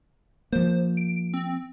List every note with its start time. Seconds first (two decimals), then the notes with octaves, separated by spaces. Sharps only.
0.52 F3 A#3 C5
0.97 D7
1.34 C4